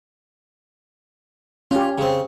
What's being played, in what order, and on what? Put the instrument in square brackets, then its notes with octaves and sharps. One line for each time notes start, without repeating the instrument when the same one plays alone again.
[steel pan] C#4 G4 [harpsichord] F4
[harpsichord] C#3 C4